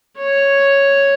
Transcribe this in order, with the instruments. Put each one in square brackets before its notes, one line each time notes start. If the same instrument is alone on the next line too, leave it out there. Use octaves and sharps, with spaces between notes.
[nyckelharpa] C#5